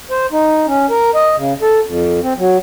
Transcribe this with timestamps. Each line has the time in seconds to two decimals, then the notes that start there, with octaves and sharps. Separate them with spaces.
0.11 C5
0.32 D#4
0.67 C#4
0.90 A#4
1.15 D#5
1.37 C#3
1.62 A4
1.86 F2
2.23 C4
2.38 F#3